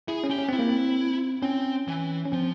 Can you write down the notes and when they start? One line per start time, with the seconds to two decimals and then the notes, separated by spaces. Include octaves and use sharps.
0.08 E4 G#4
0.24 C#4
0.30 G4
0.38 C#4
0.49 C4 E4
0.59 A#3
0.69 C4
1.42 C4 C#4
1.88 E3
2.26 C#4
2.32 F3 C4